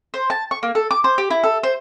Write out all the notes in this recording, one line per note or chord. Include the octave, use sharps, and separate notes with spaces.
C5
A5
C#6
A#3
A4
D6
C5
G4
E4
A4
C5